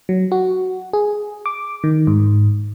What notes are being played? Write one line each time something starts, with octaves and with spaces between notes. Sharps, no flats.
F#3
F#4
G#4
D6
D#3
G#2